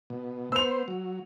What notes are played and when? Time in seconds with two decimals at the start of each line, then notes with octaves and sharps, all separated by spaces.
0.10 B2
0.52 B3 C5 E6 F7
0.88 F#3